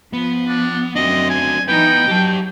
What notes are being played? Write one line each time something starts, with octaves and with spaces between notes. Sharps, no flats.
F3 B3
D4
F#2 C4 D4 F#4 D#5
G#5
E3 B3 D#4 B4 G5
F#3 G4 A5